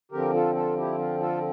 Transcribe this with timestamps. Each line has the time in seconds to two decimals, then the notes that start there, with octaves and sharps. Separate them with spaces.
0.12 D3 F3 C4 G4 A#4
0.33 F4 A4
0.55 F4 A4
0.77 E4 G4
0.98 F4
1.20 F4 A4